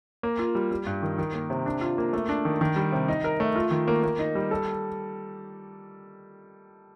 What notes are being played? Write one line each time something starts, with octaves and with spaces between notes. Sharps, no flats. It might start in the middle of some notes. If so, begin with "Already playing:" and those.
A#3
F4
G3
G3
G2
D#3
D#3
A#3
C3
D4
F4
A#3
A3
D4
D#3
D#3
G3
C3
D#4
A#4
A3
F4
D#3
A#3
A#3
D#4
G3
A4